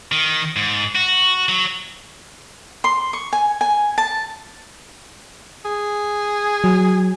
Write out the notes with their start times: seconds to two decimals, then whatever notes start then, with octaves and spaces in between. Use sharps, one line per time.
0.12 D#3
0.56 G#2
0.95 F#4
1.49 F#3
2.84 C6
3.13 C#6
3.33 G#5
3.61 G#5
3.98 A5
5.65 G#4
6.64 F#3